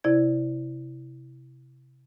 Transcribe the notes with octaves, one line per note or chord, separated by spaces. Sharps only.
C3 E4 D5 G#6